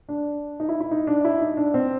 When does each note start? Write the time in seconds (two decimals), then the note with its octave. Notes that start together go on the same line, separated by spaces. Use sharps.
0.09 D4
0.60 D#4
0.69 E4
0.80 E4
0.91 D#4
1.07 D4
1.25 E4
1.41 D#4
1.57 D4
1.74 C4